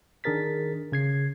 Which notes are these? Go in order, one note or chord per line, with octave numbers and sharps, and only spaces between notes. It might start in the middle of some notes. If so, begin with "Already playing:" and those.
D#3 D4 G#4 A#4 A6 B6
C#3 G#6 C7